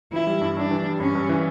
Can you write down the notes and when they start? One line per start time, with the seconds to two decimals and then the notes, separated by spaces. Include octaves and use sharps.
0.13 E3 E4
0.27 G3
0.41 G2
0.56 G2 D4
0.71 E3
0.85 G3
1.00 G2 C#4
1.15 G2
1.29 E3